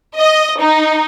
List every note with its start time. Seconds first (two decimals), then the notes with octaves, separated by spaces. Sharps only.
0.18 D#5
0.59 D#4